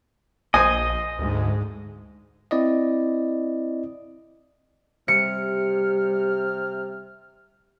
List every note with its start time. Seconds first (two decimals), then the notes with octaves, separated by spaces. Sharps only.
0.54 A#1 C5 D#5 G#5
1.19 D2 G#2 G#3
2.51 C4 E4 D5 D#5
5.08 C3 G3 F6 C#7